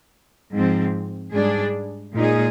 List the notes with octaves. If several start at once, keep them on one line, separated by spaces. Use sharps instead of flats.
G#2 F3 C4
G#2 G3 D4 G#4
A#2 G#3 D#4 G#4